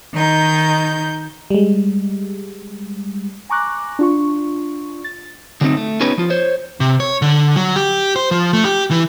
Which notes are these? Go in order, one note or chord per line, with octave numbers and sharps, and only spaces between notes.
D#3 D#4 G6
G3 G#3
G#5 A#5 C#6 D6 F#6 A#6
D4 F4 C#6
A6
D3 F#3 G#3 A3 C4 D#4
A3
B3 C#4 D#4 G4 B4 C#5
F3 F4
C5 C#5
C3
C#5
D3
F#3
G4
C5
F3
A3
G4
E3